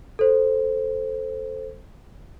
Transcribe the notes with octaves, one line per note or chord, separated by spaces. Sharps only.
A4 C5